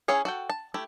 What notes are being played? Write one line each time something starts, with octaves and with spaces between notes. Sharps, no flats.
C#4 E4 G#4 C#5 F5
F#4 A4 G5
A5
A3 E4 G4